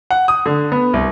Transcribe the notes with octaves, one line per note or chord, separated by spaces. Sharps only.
F#5
D#6
D3
B3
C2